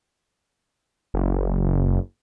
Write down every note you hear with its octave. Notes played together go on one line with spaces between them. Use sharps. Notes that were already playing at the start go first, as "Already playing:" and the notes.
F#1